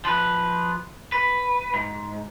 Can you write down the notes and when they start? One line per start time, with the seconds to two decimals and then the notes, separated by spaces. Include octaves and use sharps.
0.05 F3 B4
1.12 B4
1.74 G#2